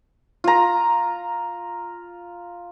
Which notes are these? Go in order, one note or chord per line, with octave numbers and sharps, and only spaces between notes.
F4 A#5